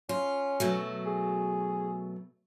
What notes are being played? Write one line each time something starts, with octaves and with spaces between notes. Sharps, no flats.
C#4 F4
B2 F#3 A3
G#4